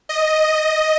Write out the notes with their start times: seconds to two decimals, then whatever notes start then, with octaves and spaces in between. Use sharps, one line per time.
0.09 D#5